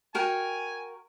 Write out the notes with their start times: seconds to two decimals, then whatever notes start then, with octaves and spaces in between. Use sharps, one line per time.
0.15 F#4 A#4 G5 G#5